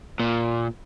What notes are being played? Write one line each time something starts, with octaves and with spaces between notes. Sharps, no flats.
A#2